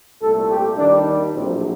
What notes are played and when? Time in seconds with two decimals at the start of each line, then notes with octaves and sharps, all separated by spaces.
0.22 C2 A#2 A3 A4
0.50 G4
0.78 D#2 D#3 G3 D4
1.06 D4
1.34 A#1 A2 F#3 A3 C4